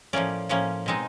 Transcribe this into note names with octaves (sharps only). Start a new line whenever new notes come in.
A2 F3 A#3 C#4 D5
A2 F3 A#3 C#4
B2 G#3 C4 D#4